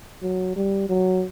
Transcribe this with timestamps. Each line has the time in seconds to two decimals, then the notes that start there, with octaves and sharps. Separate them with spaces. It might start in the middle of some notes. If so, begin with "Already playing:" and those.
0.22 F#3
0.56 G3
0.89 F#3